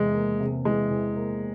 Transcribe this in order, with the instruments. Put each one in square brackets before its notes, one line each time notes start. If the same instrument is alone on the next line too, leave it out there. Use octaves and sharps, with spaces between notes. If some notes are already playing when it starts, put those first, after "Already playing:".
Already playing: [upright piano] E2 C3 E3 [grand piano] G#3
[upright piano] A#3
C3
[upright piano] E3 [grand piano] G#3
[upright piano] E2
A#3